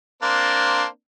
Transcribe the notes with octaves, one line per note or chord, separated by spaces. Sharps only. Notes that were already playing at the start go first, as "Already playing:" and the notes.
A#3 C4 D4